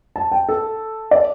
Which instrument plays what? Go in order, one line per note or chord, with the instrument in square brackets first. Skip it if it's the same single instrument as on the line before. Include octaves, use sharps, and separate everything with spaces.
[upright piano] A5
G5
A4
D5